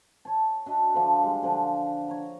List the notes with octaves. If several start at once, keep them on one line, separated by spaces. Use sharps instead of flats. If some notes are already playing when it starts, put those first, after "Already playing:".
C#5 A5
D4 F#4 D#5 E5
D3 F3 D4
G3 G#3
D3 F3 D4
C#5 A#5